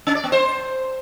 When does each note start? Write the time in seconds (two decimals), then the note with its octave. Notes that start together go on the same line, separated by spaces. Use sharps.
0.07 C#4
0.15 D5
0.24 B3
0.32 C5